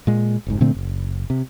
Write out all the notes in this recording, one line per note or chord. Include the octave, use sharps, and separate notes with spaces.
A#2 G#3
F1 G#2
A#2 D3 A3 C4
F#1
C3